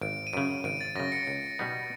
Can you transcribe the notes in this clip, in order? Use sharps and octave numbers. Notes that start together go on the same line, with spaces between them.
G#1 D7
D#7
F#2 C#3 D7
G#1 D7
A6
F#2 C#3 A#6
C#7
C#2
B2 G3 B3 D#4